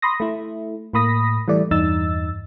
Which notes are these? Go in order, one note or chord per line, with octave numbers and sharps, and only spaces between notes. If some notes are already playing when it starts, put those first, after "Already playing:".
B5 C6 D#6 A#6
A3 E4
A2 A#3 B5 D#6 A#6 B6
E3 G3 A3 D5
E2 G2 D#4 E6 A6